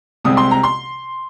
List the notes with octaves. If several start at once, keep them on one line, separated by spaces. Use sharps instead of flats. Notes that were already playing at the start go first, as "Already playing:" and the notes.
C2 C3 G#3 C4 D#6
C6
A#5
C6